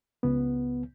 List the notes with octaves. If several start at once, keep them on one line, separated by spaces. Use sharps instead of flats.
C#2 B3